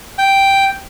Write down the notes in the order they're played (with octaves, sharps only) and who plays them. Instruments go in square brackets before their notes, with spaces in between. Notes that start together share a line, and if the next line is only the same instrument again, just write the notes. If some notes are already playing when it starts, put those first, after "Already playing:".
[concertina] G5